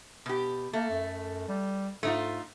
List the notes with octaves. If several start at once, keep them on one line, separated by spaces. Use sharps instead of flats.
B2 G4
A3 A#3
F#2
G3
G#2 A3 D#4 F4